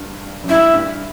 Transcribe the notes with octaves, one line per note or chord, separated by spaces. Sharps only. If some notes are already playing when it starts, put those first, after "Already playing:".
Already playing: G2
F#2
G2 E4
G2